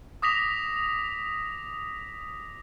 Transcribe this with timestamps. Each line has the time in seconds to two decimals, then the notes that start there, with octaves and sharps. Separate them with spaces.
0.22 D6 D#6 A#6 B6 F7